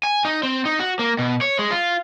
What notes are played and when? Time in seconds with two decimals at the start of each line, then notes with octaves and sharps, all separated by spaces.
0.03 G#5
0.25 D#4
0.43 C4
0.65 D#4
0.79 F#4
0.99 A#3
1.19 B2
1.41 C#5
1.59 G#3
1.71 F4